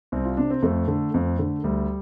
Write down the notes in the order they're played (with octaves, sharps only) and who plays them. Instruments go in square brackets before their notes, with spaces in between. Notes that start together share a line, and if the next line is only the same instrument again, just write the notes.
[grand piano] C2 C4
F4
C3 D4
C4
F2 A3
D3
F2
D3
D2 G3